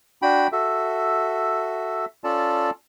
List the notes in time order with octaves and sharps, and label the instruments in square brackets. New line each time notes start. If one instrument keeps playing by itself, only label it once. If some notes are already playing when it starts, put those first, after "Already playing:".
[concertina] D4 F#4 G5 B5
F#4 A4 E5
C#4 F4 A4 D5 A5